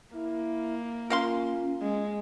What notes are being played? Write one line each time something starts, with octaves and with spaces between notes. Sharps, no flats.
A#3 E4
C#4 F4 A#4 F5 C6
G#3